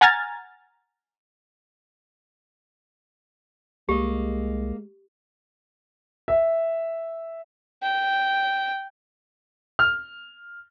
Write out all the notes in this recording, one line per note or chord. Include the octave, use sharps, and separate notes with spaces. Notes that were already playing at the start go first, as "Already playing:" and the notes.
F#5 G#5 A#5 F6 G#6 A6
C2 G#3 A#3 G4 D#5
E5
G5
F6